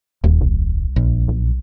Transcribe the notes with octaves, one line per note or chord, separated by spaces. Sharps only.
D#1 D#2
C2
A#1
B1